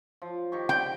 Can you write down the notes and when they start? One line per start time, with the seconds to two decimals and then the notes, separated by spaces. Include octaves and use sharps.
0.22 F3
0.52 D#3 G4 C#6
0.69 G5